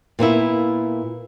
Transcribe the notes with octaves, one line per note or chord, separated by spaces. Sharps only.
A#2 A#3 B3 E4